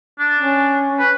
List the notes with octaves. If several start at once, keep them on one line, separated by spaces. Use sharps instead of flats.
D4
C#4
B4